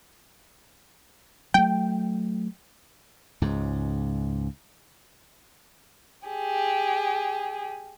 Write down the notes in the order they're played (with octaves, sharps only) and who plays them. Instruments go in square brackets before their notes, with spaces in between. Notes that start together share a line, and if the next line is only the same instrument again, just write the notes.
[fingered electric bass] F#3 A3 [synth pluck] G5
[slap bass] C#2 G#2
[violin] G4 G#4